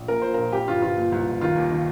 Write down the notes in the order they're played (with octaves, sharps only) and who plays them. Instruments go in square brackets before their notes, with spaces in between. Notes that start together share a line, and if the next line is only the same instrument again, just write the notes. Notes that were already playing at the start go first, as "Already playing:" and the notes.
Already playing: [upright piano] A#1
A#2 A#4
A#2 C5
A#1 A#4
F2 G4
G1 F4
G1 F4
A#2
C2
C2
D#3 F4
D#2
D#3